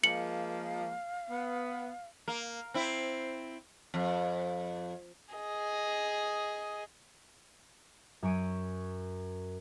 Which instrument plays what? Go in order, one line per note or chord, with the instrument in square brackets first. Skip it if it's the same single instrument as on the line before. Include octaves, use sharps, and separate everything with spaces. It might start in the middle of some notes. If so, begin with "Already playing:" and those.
[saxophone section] F3 G#3 A#3 [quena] F5 [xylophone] C#7 F#7
[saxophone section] B3
[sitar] A#3
C4 E4
F2
[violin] G#4 D#5
[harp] F#2 C#5 D7 D#7